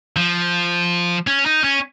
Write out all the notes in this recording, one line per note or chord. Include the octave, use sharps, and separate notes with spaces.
F3
C#4
D#4
C#4